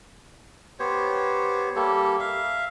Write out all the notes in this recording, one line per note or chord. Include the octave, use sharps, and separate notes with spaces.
B3 G4 C5 C#5
G3 A#3 G4 A4
E5 F5